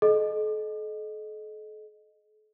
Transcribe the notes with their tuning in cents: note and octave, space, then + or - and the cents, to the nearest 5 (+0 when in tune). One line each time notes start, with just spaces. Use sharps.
A4 -40 D#5 -15